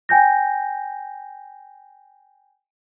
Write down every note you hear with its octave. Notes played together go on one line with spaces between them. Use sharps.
G5 G#5 G6 A#6